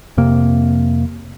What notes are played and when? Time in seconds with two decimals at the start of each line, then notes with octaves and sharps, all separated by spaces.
0.17 F2 C3 A#3